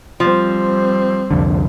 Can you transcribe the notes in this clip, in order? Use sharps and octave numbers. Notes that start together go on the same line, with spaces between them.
F3 G3 C4
C2 F2 D3